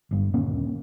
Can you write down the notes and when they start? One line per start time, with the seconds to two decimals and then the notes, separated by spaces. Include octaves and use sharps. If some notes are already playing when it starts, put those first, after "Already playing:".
0.11 G1 G2
0.33 D#1 D2 A#3 C#4